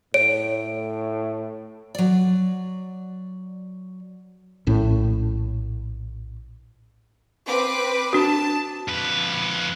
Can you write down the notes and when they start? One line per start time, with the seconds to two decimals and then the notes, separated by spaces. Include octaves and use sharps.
0.14 A2 C#5 D7
1.95 F#3 D5
4.67 A#1 A2 C#4
7.47 C4 B4 D6
8.13 D4 F#4 A5
8.88 F2 B4